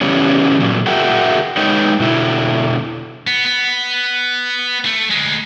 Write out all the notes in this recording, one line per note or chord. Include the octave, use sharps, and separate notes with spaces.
C#3 E3 G3 B3 C#4
A#2 F#3
F#4 G#4 A#4 E5 F#5 G5
G#3 D#4 B4 C#5 G5
B2 D3 E4
B3
B3
A3
D2 G#3